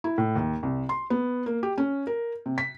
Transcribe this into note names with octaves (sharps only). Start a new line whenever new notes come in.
E4
A2
D#2
C2
C6
B3
A#3
G4
C#4
A#4
C3
B6